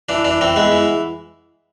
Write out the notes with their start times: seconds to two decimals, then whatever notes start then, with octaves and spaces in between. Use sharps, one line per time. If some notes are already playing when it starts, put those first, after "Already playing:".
0.09 E3 D4
0.24 E3 D4
0.41 E3 C4
0.56 G#3 B3
0.72 E3